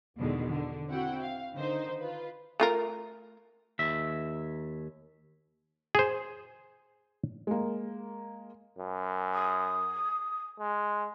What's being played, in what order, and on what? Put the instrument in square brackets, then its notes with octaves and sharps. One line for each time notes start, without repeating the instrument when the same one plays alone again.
[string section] E2 B2 D3 D#3 G#3
D3
C4 E4 F#4 F#5 G5
F5
D3 D#3 D#4 C5
F4 B4
[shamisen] A3 F4 A#4
[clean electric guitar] D#2 E5
[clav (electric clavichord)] G#4 C5
[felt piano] G#3 A#3
[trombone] F#2
[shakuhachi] D#6
[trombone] G#3